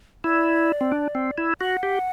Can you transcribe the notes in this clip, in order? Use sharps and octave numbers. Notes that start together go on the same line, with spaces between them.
E4 D5
C4
D4
C4
E4
F#4 F#5
G4